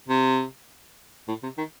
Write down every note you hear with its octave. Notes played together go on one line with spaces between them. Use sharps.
C3
A2
C3
D#3